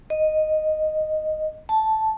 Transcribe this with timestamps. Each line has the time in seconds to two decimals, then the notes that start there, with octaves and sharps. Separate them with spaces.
0.10 D#5
1.69 A5